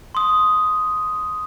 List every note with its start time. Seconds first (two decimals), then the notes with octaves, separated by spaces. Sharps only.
0.15 C6 D#6